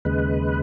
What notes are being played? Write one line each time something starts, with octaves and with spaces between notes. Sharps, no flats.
D#2 C#3 G#3 B4